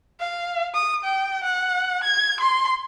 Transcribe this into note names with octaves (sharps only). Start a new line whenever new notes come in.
F5
D#6
G5
F#5
G#6
C6